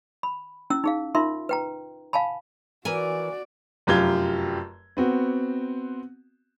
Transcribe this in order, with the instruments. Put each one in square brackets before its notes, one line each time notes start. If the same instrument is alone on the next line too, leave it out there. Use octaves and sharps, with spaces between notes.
[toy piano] B5
C#4 E4 E6
D#4 G#4 F5
D#4 F4 A#4 E5 C6
B4 G5 A#5
F5 G#5 A5 B5
[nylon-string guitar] E3 A#4 G#5 [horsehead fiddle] F#4 D5
[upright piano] F1 F#2 F4 G4 G#6 G7
B3 C4 F#4